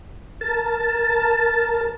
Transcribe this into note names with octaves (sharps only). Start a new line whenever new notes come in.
A#4 A5